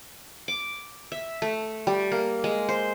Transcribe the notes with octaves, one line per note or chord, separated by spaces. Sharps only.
D6
E5
A3
G3
A#3
G#3
C5